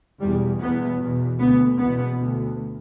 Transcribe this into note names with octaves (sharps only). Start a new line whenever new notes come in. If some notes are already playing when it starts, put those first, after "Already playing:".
E2 B2 G3
E2 B2 B3
E2 B2
D2 B3
E2 B2 B3
D2